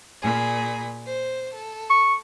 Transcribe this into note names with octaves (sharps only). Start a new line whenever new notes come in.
A#2 G#4 B5
C5
A4
C#6